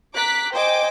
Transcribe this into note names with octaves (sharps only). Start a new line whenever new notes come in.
A#5 D6 F#6 B6
C5 D#5 G5 G#5 D6